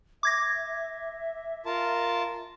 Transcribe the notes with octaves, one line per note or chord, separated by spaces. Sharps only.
E5 D6 G#6 A#6
F4 A#4 A5